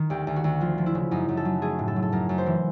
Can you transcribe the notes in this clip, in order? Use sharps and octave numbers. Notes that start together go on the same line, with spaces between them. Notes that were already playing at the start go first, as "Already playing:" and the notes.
Already playing: D#3
D2 G4
D2
F#4
D2
F3 F4
F3
E4
C#3
F#2 D#4
F#2
A4
F#3
A3 G#4
A2
A4
F#3
A4
F#2 A#4
F#2
C5
E3